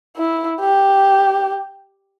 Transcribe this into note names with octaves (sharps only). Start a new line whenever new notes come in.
E4
G4